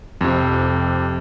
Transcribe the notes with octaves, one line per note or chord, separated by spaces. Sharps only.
F2 C3